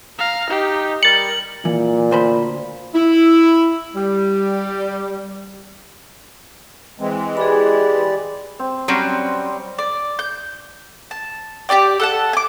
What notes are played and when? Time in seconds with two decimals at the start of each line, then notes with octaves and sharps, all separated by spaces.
0.19 F5 A#5
0.50 D#4 G4
1.03 G3 A#4 A6 C#7 F#7
1.65 A#2 E3
2.11 D2 C5 B5
2.95 E4
3.95 G3
7.00 E3 G#3 C4
7.37 G4 G#4 D5 B5
8.59 C4
8.88 F#3 G3 C4 C#4
9.78 D5
10.19 G6
11.11 A5
11.69 G4 G#4 D5 G5
12.00 A4 F#5 A5
12.33 G#5 D6